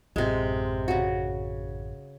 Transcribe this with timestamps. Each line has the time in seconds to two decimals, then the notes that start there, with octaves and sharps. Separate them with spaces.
0.16 A1 F#2 C3 G#3
0.88 C#3 F#4